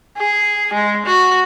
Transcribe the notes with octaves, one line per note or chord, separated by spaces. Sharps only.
G#4
G#3
F#4